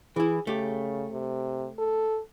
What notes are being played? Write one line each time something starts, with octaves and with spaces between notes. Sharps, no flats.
E3 E4 G#4
C#3 A3 G4
C3
A4